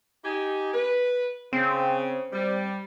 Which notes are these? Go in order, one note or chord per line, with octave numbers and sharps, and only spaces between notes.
D#4 G4 G#5
B4
C#3 C4
G3